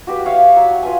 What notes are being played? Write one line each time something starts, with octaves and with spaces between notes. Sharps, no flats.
F#4 G4 B4
C#5 E5 F5
F#3
F4 B4 G#5